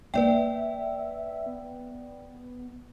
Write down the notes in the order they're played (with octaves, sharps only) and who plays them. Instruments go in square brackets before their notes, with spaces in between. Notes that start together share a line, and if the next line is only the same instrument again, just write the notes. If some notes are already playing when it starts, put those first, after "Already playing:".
[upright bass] A#3 D#4 [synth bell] B4 D5 G5 [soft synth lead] E5
[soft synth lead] B3